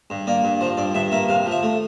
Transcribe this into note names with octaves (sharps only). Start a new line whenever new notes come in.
G2
A#3 D5
G2
F3 C5
G2 D5
G2 E5
A#3 E5
C3 F5
F3
E5
A3